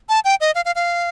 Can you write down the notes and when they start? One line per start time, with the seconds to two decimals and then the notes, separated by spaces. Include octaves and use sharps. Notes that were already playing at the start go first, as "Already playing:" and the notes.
0.09 A5
0.25 G5
0.41 D#5
0.55 F5
0.65 F5
0.76 F5